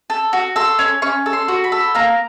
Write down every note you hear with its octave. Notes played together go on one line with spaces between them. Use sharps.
A4
F#4
A4 C6
C#4
C#4 C#6
A4
C6
F#4
B5
A4
A#3 A#5